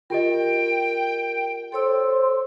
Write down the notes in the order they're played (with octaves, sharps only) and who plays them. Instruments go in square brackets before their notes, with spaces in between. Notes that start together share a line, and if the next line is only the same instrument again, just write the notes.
[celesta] F4 G4 D#5 [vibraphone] A#4 [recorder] G5
[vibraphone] A4 C#5 E6 [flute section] C5 C6